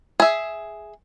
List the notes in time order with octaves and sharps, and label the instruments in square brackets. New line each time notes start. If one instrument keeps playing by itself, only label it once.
[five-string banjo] G#4 E5